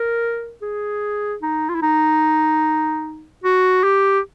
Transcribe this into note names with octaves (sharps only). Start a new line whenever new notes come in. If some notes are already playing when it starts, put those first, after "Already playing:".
Already playing: A#4
G#4
D#4
F4
E4
D#4
F#4
G4